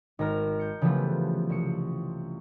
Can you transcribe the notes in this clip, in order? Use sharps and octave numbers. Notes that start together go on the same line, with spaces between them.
G#1 A#4 A#5 F6
G6 C#7
C#3 E3 F3 G3 A3 B3
C2 C#7